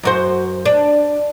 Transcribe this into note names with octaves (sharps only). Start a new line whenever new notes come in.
F#2 F#4 C5
D4